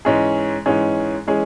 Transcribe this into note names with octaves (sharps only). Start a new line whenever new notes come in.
G#2 E3 G#3 C#4 G#4
G#2 E3 G#3 C#4 G#4
E3 G#3 C#4 G#4